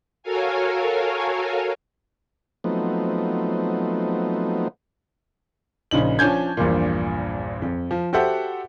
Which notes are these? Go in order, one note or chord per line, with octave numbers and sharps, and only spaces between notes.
F#4 A4 A#4 C#5 F5 G#5
F3 F#3 A3 B3 C4 D#4
A#1 C#3 D#4 F#7
F3 C#4 D4 G#5 G6 G#6
A#1 E2 G2 A#2
F2
F3
F#4 G4 A4 C5 E5 F#5